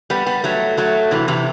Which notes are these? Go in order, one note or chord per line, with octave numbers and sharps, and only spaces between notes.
G3 B3
G3 B3
F#3 A3
F#3 A3
C3 E3
C3 E3